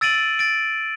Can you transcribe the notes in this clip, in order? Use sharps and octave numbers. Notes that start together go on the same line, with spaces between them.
E6 A6 D7 D#7 F#7
A6 D7